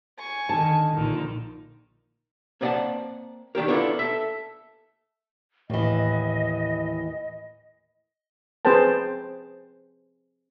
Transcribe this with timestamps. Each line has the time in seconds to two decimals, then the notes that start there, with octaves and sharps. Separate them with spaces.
0.19 G#5 C#6
0.49 D3 D#3 A5
0.95 A#1 A#2 D3 D#3
2.61 A#3 C4 D5 D#5 F#5 A5
3.55 D#3 D4 G4 A#4
3.68 B3 D4 E4 F4 A4 A#4
3.99 A4 E5
5.70 D#2 A2 E3 D#5
8.65 C4 G#4 B4 C5 G5 A5